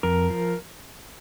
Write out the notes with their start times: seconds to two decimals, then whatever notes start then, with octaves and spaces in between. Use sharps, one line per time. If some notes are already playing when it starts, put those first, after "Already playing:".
0.03 F2 A#4
0.30 F3